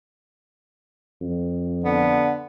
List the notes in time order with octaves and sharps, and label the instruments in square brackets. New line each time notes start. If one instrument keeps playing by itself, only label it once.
[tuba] F2
[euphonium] D3 [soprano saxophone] B3